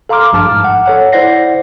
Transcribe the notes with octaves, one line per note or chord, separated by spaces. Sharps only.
A4 F5 A#5 C6 D6 F6
A1 G2 F3 A5 D6 F6
G#2
F#5
A4 C#5 F#5
E4 C5 D5 F#5 A#6 C7